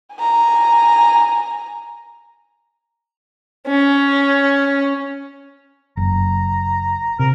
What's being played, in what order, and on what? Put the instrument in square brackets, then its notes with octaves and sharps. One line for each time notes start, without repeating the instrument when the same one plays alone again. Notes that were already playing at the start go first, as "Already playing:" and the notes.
[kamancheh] G#5 A#5
[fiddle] C#4
[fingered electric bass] F#1 [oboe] A#5
[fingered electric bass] C3 [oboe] A#4